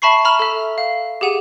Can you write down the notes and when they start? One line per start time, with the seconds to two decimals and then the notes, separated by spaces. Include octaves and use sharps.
0.02 E5 A5 B5 C#6 C7
0.25 A#5 B5 F6
0.39 A4 E5
0.78 F5
1.21 G4 G#4 F#5 D#7